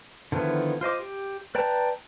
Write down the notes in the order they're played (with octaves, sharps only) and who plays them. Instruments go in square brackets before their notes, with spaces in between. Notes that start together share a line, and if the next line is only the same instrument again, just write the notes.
[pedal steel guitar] D3 D#3 F3 B3 E4
F4 C5 D#5 D6
G4
B4 D5 G5 A5 A#5